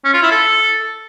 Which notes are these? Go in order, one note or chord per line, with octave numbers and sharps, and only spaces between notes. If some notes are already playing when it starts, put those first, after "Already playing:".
C#4
F4
E4
A4